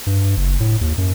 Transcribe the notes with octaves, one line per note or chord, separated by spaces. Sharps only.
G2
F#1
A2
D#2
F#2